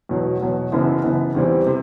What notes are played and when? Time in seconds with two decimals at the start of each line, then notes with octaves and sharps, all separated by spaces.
0.09 E2 B2 F#3
0.41 E2 B2 F#3
0.72 F#1 F#2 E3 B3
1.04 F#1 F#2 E3 B3
1.35 E2 C3 E3 G3 C4
1.67 C3